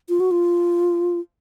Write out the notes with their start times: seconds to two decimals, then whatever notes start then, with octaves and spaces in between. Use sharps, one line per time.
0.09 F4
0.20 F#4
0.31 F4